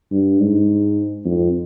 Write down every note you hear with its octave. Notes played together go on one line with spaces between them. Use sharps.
G2
G#2
F2